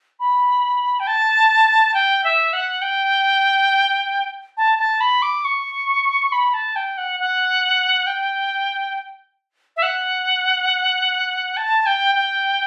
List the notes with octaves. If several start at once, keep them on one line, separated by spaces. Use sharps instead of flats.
B5
G5
A5
G5
E5
F#5
G5
A5
A5
B5
D6
C#6
B5
A5
G5
F#5
F#5
G5
E5
F#5
A5
G5
G5